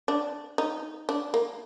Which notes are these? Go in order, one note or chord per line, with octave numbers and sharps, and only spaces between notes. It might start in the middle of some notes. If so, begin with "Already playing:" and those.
D4
D#4
D4
A#3